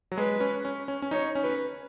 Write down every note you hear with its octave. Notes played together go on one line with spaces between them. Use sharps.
F#3
G#3 B4
C#4
C#4
C#4
C#4
D#4 C#5
C#4
B4